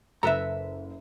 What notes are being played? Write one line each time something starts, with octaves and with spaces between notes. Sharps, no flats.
F#1 A4 B4 E5 A#5